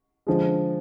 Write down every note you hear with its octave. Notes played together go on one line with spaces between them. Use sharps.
D3 F3 G#3